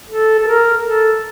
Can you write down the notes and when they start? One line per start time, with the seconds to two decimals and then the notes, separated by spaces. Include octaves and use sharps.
0.09 A4
0.39 A4
0.48 A#4
0.86 A4